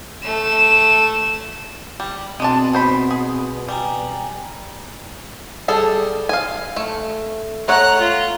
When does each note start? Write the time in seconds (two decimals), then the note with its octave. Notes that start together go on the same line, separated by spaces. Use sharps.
0.23 A3 E7
2.00 G3
2.40 B2 G#3 C4 D4 A5
2.73 D#3 C5 B5
3.11 G#4
3.68 G3 G5 G#5 A#5
5.68 G3 G#4 A4
6.29 F5 G#5
6.76 A3
7.68 A3 C#5 F#5 A#5 F#6
7.99 F4